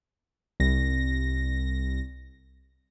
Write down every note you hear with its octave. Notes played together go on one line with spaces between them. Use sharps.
C2 A#6